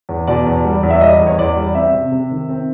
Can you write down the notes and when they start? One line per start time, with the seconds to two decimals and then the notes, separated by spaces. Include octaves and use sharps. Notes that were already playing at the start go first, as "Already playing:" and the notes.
0.09 E2
0.27 B2 D5
0.46 E2
0.65 G3
0.83 E2
0.90 E5
1.01 G3 D#5
1.20 E2
1.27 C#5
1.38 E2 D5
1.56 G3
1.75 C4 E5
1.94 C3
2.12 C3
2.31 D#3
2.49 C4